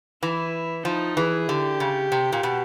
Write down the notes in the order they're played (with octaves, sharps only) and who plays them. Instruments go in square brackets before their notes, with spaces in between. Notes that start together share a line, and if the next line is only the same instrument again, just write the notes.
[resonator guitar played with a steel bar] E3 [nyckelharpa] E4
[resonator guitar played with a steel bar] F3 [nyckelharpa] D#4
[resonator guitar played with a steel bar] E3 [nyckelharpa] G#4
[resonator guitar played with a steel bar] D3 [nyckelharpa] G4
[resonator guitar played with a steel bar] C#3
C3
A#2
B2